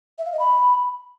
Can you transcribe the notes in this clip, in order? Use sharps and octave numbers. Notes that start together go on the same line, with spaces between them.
E5
F5
D#5
B5